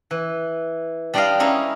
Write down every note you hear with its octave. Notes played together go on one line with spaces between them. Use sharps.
E3
G3 D4 G4 D5 D#5 F5
G#3 C#4 D#4 E4 G#4